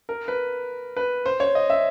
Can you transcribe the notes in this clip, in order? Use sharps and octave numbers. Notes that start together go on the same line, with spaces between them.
A#4
B4
B4
C5
C#5
D#5
E5